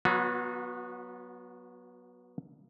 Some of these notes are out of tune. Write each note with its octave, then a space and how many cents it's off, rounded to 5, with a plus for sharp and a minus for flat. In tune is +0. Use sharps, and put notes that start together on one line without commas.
F#3 +0 B3 -15 F#4 -45